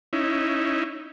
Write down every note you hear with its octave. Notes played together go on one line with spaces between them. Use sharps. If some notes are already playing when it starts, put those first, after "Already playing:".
C#4 D#4 E4